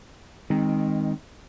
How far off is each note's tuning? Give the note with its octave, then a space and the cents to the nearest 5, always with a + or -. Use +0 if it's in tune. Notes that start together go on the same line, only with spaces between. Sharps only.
D#3 +0 G#3 -25 C4 +10